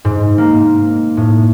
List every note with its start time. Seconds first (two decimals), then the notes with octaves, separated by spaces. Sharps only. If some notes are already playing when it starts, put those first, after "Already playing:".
0.05 G#2
0.38 A#3
1.17 A2